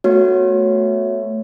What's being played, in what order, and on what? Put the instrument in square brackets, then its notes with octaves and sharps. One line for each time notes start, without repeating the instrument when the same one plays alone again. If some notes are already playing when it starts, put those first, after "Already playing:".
[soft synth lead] A3 [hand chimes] B3 F#4 C#5